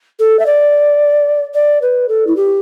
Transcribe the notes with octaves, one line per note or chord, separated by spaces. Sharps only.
A4
E5
D5
D5
B4
A4
E4
G4